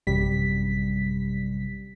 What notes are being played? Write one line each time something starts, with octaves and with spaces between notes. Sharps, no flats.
A1 F#2 C3 G3 B6